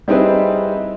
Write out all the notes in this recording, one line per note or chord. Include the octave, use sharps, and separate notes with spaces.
G3 C4 D#4 E4 G#4 B4